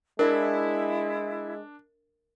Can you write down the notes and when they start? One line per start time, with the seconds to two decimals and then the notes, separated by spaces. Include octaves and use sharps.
0.19 G#3 D4 E4 A#4 E5